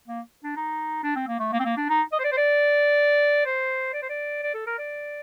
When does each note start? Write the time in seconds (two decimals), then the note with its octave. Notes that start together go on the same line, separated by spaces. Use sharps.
0.08 A#3
0.44 D4
0.56 D#4
1.04 D4
1.16 C4
1.28 A#3
1.40 A3
1.53 A#3
1.60 C4
1.65 A#3
1.77 D4
1.89 D#4
2.13 D#5
2.19 C5
2.24 D5
2.32 C5
2.38 D5
3.46 C5
3.93 D5
4.02 C5
4.10 D5
4.43 D5
4.54 A4
4.67 A#4
4.78 D5